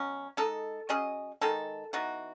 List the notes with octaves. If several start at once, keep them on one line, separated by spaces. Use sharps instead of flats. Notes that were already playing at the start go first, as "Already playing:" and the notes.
Already playing: B2 F#3 C#4
G#3 D#4 A4
F#3 C#4 G#4 D#5
D#3 G#3 D#4 A4
E3 B3 D#4 F#4